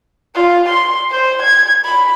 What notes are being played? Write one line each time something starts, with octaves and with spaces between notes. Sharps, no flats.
F4
C6
C5
G#6
B5